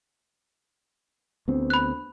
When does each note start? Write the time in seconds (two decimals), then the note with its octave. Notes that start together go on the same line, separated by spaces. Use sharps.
1.48 D2 B3 C4
1.70 B5 F#6